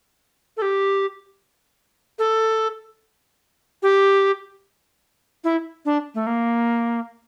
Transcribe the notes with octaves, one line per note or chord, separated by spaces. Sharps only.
A4
G4
A4
G4
E4
D4
A3
A#3